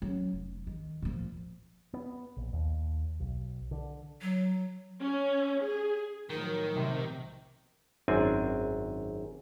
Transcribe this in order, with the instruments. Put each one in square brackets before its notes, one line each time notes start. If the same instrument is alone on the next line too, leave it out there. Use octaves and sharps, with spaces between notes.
[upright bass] F#3 C#4
F1
D#3
A#2 F3
[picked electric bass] B3
A#1
D#2
B1
D3
[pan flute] F#3
[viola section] C#4
G#4
[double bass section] A2 F3 F#3 [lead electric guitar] D#3 [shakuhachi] A#4
[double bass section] B1 [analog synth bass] C3
[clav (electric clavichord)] G#1 F#2 C4 D4 G#5